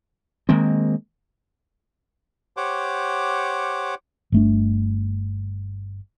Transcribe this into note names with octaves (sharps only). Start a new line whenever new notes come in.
D#3 G#3 A#3 C4
G4 C5 C#5 F#5 D6
G1 A3 D4